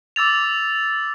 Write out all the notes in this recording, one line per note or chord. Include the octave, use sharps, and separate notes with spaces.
D6 E6 A6 F7